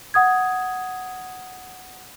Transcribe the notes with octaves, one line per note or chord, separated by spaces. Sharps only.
F#5 D#6 G#6